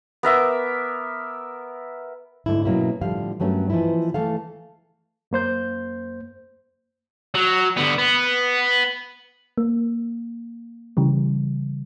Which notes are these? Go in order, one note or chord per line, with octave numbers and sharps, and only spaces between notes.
B3 A#4 E5 D6
G#2 D3 A3 E4
B2 F#3 A#3 C#4 E4
A2 D3 F3 G3 F5
G2 F#3 A3 C#4 A#4
E3 F3 A#3 D#4 E4
E3 A3 A4 F5
F#2 A#3 C5 G6
F#3
D3 B3
B3
A#3
C#3 E3 G3